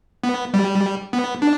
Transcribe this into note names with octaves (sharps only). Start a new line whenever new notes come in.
B3
G3
B3
D4